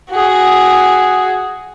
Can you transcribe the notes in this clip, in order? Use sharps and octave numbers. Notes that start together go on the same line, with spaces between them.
F#4 G#4